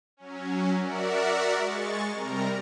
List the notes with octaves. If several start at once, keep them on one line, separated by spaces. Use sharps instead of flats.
F#3 C#4
F#4 A#4 D5 E5 F#5
G#3 C#6 A6
C3 G3 A#4 A#5